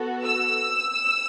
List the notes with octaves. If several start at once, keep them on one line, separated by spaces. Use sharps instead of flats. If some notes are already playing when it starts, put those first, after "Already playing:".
Already playing: B3 F#4 A4
E6